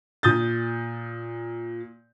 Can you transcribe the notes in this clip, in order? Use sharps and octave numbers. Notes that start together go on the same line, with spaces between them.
A#2 D#6 G6 A6